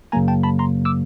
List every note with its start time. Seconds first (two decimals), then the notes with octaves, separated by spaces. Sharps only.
0.12 F#2 C#3 F#3 A#3 G#5 A#5
0.28 G5 A5
0.43 A5 B5
0.59 A#5 C6
0.85 D6 E6